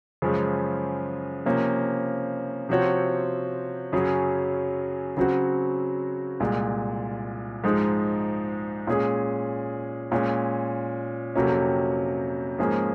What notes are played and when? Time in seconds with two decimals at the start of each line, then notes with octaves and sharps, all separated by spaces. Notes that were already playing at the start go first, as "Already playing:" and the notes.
0.22 F#2 C#3 F3 G#3 C#4
1.45 C3 F3 A#3 C#4
2.69 C3 F3 C4 F#4 C#5
3.92 F#2 C#3 F#3 C#4 G#4
5.17 C#3 F#3 C4 F#4
6.40 C2 A#2 G#3
7.64 G#2 F3 G#3 D#4
8.87 A#2 G#3 C#4 G#4
10.11 A#2 G#3 C#4
11.35 F2 C3 F#3 A#3 C#4
12.59 G#2 F3 A#3 C#4 G#4